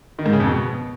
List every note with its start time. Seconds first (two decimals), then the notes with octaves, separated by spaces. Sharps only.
0.19 D#3
0.26 G#2
0.33 C#3
0.40 F2
0.47 B2